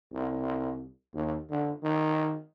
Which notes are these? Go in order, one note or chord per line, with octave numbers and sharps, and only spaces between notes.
C2
D#2
D3
D#3